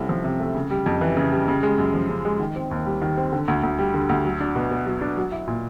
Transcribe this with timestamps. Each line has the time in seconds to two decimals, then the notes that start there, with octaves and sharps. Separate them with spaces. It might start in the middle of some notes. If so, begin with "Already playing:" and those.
Already playing: C2 C3 A3 C#4
0.09 F3
0.24 C3
0.40 A3
0.55 C#3
0.70 G3
0.86 F2
1.01 E3
1.17 C#3
1.32 G3
1.48 C#3
1.63 G#3
1.78 F#2
1.94 F3
2.09 C#3
2.25 G#3
2.40 D#3
2.56 C4
2.71 D#2
2.86 G3
3.02 D#3
3.17 C4
3.33 D3
3.48 D2
3.63 D2
3.79 G3
3.94 D3
4.09 D2
4.25 F#3
4.40 D4
4.56 B2
4.71 B3
4.86 F#3
5.01 D4
5.17 F#3
5.32 E4
5.48 A#2